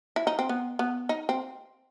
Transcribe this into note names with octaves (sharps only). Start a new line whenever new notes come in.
E4
D#4
C4
B3
B3
D#4
C4